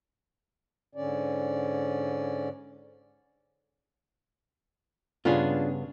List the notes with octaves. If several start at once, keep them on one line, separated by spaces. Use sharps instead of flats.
G#2 D3 C#4 D5
G2 C#3 B3 C#4 D4 F4 G#4